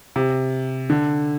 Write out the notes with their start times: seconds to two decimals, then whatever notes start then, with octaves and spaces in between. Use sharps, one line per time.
0.16 C3
0.90 D3